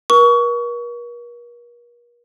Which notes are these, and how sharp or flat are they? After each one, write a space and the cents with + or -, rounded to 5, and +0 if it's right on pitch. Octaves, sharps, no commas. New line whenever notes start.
A#4 +45 C#6 +25